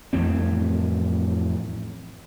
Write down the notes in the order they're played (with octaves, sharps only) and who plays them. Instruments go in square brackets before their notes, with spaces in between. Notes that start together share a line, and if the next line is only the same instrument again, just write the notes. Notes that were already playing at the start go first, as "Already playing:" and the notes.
[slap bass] F2 A2 E3 C4